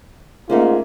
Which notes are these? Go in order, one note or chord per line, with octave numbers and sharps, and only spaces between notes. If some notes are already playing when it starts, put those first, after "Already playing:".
G#2 A3 A#3 C#4 F4